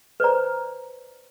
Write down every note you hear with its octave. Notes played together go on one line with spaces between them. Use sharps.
B4 C5 D5 A#5